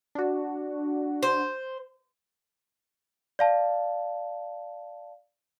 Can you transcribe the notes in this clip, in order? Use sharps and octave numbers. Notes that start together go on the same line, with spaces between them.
D4 F#4
C5
D5 F5 A5